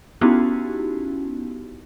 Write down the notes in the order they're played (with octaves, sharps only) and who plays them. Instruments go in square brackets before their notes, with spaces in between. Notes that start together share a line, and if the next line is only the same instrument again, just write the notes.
[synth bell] B3 C#4 D#4 E4 F#4 G4